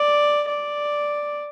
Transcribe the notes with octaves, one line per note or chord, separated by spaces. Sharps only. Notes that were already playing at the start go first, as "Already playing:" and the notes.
Already playing: D5
D5